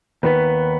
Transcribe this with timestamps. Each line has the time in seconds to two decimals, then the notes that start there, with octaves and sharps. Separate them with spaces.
0.23 D#2 D#3 B3 B4